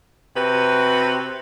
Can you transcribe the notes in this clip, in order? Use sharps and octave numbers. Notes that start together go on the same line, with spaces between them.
C3 F#4 B4